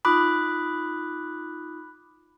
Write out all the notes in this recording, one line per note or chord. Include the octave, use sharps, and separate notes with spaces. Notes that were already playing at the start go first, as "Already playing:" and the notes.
D#4 F4 B5 D6 D#6 F#6